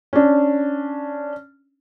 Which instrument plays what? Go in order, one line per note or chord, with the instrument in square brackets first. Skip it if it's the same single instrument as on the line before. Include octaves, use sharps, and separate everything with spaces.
[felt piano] C#4 D4